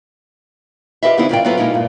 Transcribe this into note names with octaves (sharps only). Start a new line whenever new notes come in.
F4 G4 G#4 B4 D#5 E5
D3 E3 B3 C4 D#4 E4
D#2 G#2 C#3 F4 D5 G5
F#3 B3 E4 F4 A4 B4
B2 G#3 A#3 D#4 E4
G2 A#2